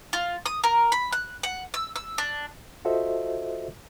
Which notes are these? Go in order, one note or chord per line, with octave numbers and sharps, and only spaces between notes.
F4
D#6
A#4
B5
F#6
F#5
E6
E6
D4
F4 F#4 A4 C5 D#5 E5